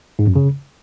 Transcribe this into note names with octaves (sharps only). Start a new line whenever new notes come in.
G#2
F#2
C#3